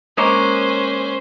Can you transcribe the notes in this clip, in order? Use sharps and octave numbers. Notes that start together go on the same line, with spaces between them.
G#3 A#3 C#4 C5 C#5